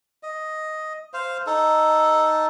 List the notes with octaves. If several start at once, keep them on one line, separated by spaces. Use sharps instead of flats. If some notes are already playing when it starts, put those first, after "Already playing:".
D#5
C5 F5
D#4 A4